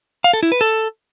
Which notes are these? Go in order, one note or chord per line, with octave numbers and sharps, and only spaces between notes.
F5
A4
E4
B4
A4